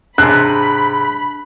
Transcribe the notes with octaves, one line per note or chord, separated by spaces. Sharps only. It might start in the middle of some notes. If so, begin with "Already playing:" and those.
G#2 C3 D4 G#5 B5 F#6